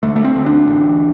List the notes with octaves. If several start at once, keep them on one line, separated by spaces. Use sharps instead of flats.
D2 A3
A3
C4
D2
D4
A1